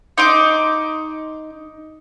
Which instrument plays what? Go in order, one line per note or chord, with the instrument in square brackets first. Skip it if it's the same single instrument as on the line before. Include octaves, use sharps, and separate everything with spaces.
[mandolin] D#4 C6 D6